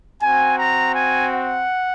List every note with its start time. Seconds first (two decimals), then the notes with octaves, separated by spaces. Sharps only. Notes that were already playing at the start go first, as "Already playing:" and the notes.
0.21 C4 F#4 G#5
0.58 A#5
0.94 G#5
1.31 F#5